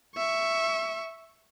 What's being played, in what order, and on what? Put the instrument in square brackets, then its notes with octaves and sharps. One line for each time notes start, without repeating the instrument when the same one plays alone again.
[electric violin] E5 C#6